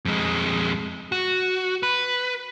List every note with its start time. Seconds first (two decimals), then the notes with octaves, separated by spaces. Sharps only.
0.05 F2 G#3
1.12 F#4
1.83 B4